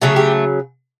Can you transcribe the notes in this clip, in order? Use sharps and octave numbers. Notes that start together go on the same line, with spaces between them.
C#3 F#3 A3 G#4
G4